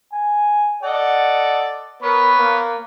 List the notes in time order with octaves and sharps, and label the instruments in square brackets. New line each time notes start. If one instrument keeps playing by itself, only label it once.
[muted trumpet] G#5
[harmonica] A4 D5 D#5 [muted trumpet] F#5
[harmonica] B3 B4 C#5 [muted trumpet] A#4
[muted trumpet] A#3